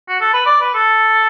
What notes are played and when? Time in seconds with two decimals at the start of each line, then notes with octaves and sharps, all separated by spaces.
0.08 F#4
0.21 A4
0.34 B4
0.46 D5
0.61 B4
0.74 A4